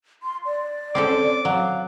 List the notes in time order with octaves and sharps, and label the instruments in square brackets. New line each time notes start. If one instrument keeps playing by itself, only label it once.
[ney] C6
D5
[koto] C4 C#4 A4 [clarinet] D6
[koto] F#3 [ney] F5